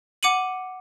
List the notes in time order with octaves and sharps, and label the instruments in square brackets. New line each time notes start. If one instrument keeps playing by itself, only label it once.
[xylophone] F#5 D6 C#7 D#7 F#7